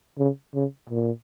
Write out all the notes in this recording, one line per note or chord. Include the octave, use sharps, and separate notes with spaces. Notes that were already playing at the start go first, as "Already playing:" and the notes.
C#3
C#3
A#2